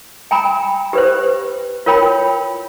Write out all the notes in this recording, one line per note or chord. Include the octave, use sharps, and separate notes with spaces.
G5 G#5 A#5 B5
G4 B4 C5
F4 A#4 C#5 G5 B5